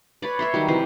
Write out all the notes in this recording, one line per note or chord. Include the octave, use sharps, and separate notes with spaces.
B4 C#5 D5
C#5 E5 C6
D#3 F#3 G3
C3 E3 C5